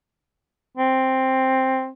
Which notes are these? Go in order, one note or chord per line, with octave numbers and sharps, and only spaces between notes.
C4